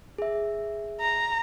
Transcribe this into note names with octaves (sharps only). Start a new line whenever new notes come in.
G#4 E5
A#5